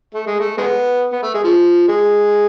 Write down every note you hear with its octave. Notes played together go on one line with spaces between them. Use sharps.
A3
G#3
A3
G#3 B3
B3
A3
G#3
F3
G#3